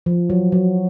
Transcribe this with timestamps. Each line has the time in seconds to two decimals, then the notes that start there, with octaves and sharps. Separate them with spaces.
0.06 F3
0.30 F#3
0.52 F#3